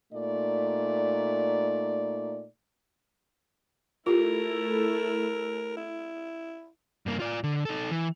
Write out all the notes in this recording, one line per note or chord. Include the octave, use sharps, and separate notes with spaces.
A#2 A3 D#4 D5
A3 E4 F4 G4 A#4
E4
G2 A#3
F4 D5
D3
D#4 A4
E3